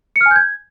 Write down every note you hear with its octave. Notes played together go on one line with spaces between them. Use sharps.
C#7
F6
G#5
G6
G#6